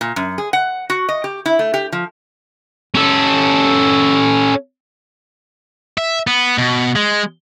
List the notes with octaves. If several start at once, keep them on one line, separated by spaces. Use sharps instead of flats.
A#2
F#2
G#4
F#5
F#4
D#5
G4
E4
A3
G4
F3
C#4 A4
E5
B3
B2
G#3